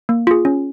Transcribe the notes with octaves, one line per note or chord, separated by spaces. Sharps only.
A#3
F4 G#4
C#4